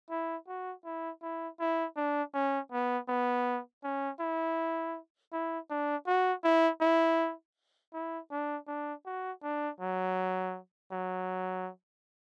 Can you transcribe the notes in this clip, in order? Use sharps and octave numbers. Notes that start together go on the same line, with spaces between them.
E4
F#4
E4
E4
E4
D4
C#4
B3
B3
C#4
E4
E4
D4
F#4
E4
E4
E4
D4
D4
F#4
D4
F#3
F#3